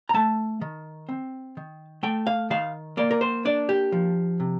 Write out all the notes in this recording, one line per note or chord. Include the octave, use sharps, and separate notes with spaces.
A#5
A3 A5
D#3
C4
D#3
A3 G5
F5
D#3 F5
A#3 D5
A#4
C5
D4 D5
G4
F3
C3